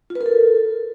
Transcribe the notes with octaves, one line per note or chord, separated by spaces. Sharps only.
F4
B4
A#4
A4